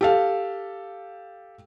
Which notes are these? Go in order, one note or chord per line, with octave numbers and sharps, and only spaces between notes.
G4 A4 F5